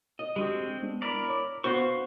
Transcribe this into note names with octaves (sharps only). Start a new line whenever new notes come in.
D#5
G#3 A3 C4 D4 F#4 G4
G#3 B3 D4
E4 A#4 D5
C#5 D6
B3 D4 F#4 C5 F5 F#5 C#6